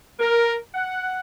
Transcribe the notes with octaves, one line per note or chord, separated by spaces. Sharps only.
A#4
F#5